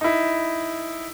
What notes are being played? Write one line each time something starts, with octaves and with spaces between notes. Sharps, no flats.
D#4 E4